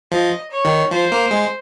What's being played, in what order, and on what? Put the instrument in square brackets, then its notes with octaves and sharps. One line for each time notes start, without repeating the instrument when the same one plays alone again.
[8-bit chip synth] F3 [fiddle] D#5
[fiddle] C#5
[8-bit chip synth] D#3
[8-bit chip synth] F3 [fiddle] C5
[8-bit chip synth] A#3
G#3